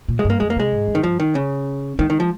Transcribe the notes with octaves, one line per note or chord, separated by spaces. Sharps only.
A#2
G#3
G2
A#3
F2 G#3
A#3
C3 G#3
G#2
G2
D#3
G2 F3
D#3
C#3
D#3 G#3
D#3
F3